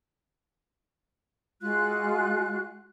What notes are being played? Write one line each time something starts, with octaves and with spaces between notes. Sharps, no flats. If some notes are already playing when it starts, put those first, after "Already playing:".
G#3 F4 F#4 F#6